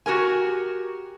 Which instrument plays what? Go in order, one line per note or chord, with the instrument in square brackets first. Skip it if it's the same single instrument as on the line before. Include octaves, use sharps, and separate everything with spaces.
[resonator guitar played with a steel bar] F#4 G4 A#4 G#5